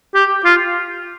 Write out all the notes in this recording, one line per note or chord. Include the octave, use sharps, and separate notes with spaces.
G4
F4